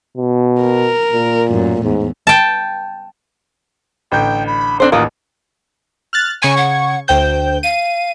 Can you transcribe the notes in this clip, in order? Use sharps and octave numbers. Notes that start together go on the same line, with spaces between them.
B2
A#4
A#2
F#2 A2
E2 G#2
G5 A5
A1 D3 G5 G6
B5
C4 D4 A4 C5
A1 D#2 F4 F#4 A#4 D#6
F6 F#6 A6
C#3 G#5 C#6 G#6
F#5
D2 C5 G5 G6
F5 D#7